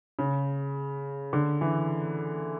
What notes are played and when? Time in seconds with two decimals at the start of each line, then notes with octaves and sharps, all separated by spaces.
0.19 C#3
1.33 D3
1.61 E3